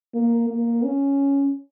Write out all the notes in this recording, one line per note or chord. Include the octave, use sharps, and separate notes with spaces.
A#3
A#3
C#4